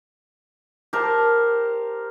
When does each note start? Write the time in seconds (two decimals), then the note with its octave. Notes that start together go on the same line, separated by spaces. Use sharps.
0.93 G4 A#4 C5 A5